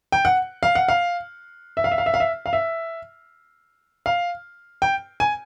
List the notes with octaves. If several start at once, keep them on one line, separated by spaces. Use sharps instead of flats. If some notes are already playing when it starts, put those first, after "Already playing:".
G5
F#5
F5
F#5
F5
E5
F5
E5
F5
E5
F5
E5
F5
E5
F5
G5
G#5